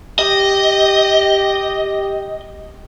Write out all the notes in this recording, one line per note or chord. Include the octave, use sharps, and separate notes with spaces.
G4 D#5